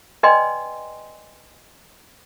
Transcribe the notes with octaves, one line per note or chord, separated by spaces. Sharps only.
B4 D5 D#5 G5 G#5 C6